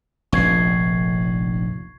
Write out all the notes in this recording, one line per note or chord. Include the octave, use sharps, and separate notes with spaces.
F1 A#1 C#6 G#6 C7